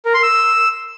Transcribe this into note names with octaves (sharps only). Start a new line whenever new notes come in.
A#4
C6
E6